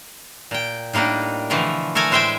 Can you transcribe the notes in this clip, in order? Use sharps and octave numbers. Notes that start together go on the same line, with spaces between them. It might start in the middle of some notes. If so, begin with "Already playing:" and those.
A#2 G5
A2 G3 A#3 D4 D#4
B2 D3 E3 F3 A3
A3 A4 A#4 G#5 A#5
A2 G#3 C5 E5 G5 G#5